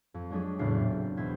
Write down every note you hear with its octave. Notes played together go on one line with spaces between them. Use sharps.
F2
F#3 G#3 D4 G4 G#4
F#1 E2 A2 D4 C7
A#2
C4
E2 B2 E4 C5 G#6